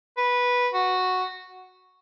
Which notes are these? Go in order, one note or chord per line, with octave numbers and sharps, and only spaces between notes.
B4
F#4